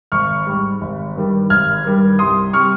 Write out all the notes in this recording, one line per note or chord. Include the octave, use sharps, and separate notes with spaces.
G#1 C#6 F6
G#2 G3
G#1
G2 D#3 G3
G#1 F6 G#6
G2 D#3 G3
C2 C6 D#6
C3 G3 C#6 F6